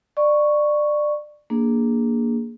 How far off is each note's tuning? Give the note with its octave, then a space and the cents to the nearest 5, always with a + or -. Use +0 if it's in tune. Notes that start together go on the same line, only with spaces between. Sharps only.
D5 +20 C#6 +0
A#3 +0 D4 +0 G#4 +0